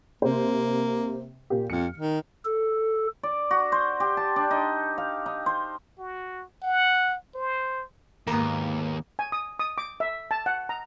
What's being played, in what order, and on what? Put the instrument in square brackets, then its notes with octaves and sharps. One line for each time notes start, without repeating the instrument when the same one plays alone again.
[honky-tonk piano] C3 C5 [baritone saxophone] A#3
[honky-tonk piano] A#2 A#3 G4
[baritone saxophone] F2 [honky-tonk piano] F6 C#7
[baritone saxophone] D#3
[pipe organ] A4
[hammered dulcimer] D5
F#4
C5
G4
A5
D4
D#4
F5
D#4
C5
[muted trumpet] F#4
F#5
C5
[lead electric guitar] D#2 [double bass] G#2 A#3 [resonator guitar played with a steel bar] B3 A#4
[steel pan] G#5
D#6
D#6
D6
E5
A5
F#5
A#5